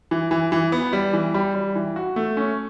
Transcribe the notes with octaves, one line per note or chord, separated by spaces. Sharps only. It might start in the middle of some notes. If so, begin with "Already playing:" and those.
E3
E3
E3
B3
G3
E3
G3
G3
E3
F#4
A3
C#4